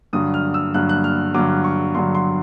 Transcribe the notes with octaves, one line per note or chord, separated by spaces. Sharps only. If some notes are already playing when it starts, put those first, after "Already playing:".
G2 D3 F#3 D#6
F6
E6
G2 D3 F#3 F#6
F#6
F6
G2 D3 F#3 D6
C#6
G2 D3 F#3 C6
C6